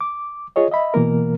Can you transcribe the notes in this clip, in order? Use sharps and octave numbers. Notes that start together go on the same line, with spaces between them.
D6
F4 G#4 C#5 D#5
D#5 E5 B5
B2 E3 A#3 A#4